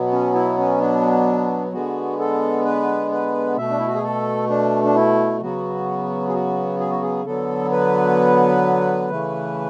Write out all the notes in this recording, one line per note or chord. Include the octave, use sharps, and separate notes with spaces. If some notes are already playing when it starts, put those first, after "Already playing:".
Already playing: B2 F#3 B3
C#4
E4
C#4
D4
D3 G#3 B3 F#4
A4
B4
B4
B2 A3 E5
D4
E4
F#4
G#4
A4
D4
D4
E4
C#3 F#3 B3 F#4
G#4
F#4
G#4
F#4
G#4
D3 F#3 B3 A4
B4
C#3 E3 A3